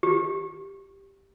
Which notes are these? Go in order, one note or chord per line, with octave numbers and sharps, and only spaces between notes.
G4